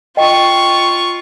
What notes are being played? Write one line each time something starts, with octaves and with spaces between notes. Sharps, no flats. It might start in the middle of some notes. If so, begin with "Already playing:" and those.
F4 D#5 G5 C#6